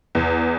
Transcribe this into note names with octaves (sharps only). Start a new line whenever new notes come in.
E2